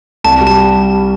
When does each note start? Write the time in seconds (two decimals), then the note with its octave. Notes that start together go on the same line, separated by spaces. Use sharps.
0.24 C2 A5
0.41 G3
0.47 A5